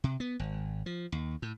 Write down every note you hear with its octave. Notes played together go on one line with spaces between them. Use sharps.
C3
B3
G#1
F3
D#2
A2